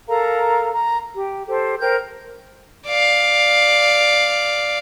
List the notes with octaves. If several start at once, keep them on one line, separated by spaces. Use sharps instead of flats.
A4 A#4 F5 A#5
A#5
G4
G4 A4 C5
A#4 C5 G5 G6
D5 F5